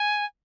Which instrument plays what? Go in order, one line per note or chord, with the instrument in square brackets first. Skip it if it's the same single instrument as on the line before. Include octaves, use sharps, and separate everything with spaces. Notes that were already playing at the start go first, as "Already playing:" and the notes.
Already playing: [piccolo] G#5